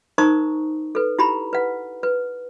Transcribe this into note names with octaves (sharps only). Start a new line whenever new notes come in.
D#4 A#4 C5 A#5 C#6 D#6
A4 B4
E4 G4 A#5 B5
B4 F#5
B4